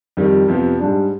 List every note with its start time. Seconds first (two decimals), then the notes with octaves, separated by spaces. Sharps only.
0.17 F2 D#3 G3
0.48 F2 C3 F3 B3
0.79 G#2 G3 D4